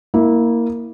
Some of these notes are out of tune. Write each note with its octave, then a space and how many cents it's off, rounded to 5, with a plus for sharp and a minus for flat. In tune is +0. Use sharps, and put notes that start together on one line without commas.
A#3 +0 E4 -20